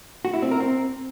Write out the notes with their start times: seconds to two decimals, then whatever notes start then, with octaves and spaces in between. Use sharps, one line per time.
0.25 F#4
0.34 E4
0.42 C4
0.51 A#4
0.60 C4